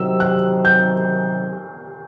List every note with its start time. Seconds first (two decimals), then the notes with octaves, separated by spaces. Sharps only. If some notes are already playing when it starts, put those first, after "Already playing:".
Already playing: C3 D#3 F#3 E6
0.20 F#6
0.65 G6